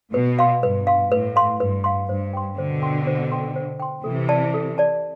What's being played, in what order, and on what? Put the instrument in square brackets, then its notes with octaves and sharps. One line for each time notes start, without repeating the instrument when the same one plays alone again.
[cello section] B2 [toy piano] B4
[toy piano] F5 C6
[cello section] G2 [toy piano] B4
[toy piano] F5 C6
[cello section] A2 [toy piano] B4
[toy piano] F5 C6
[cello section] G2 [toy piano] B4
[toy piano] F5 C6
[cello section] G2 [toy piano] C5
[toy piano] G5 C6
[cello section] B2 D3 [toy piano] C5
[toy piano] G5 C6
C5
G5 C6
C5
G5 C6
[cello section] C3 E3 [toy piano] A4
[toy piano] D5 A5
A4
D5 A5